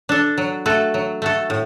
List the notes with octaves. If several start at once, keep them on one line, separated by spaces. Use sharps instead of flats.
D4 A4
F#3
A3 F#4 A4
F#3
A3 F#4 A4
A2